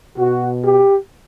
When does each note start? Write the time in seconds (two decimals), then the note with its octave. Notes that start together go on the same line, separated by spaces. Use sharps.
0.18 B2 F#4
0.64 G4